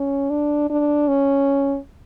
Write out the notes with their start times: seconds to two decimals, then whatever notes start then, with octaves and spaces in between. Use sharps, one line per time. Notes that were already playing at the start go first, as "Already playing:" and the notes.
Already playing: C#4
0.30 D4
0.70 D4
1.08 C#4